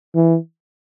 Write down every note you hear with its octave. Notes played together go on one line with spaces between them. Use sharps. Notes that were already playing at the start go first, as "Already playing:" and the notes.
E3